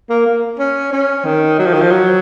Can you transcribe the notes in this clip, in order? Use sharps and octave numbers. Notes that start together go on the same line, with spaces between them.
A#3
A#3
C#4
C#4
D#3
F#3
F3
D#3
F3
F#3